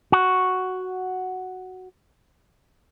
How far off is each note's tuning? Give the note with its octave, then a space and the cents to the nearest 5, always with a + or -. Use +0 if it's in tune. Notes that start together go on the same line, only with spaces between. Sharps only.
F#4 +0